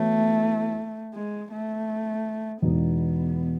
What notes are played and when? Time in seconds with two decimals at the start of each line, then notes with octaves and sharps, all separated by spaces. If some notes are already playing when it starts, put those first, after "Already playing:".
Already playing: E3 A3 B3 F#4 C#5
1.14 G#3
1.52 A3
2.62 E2 B2 G#3 B3 D#4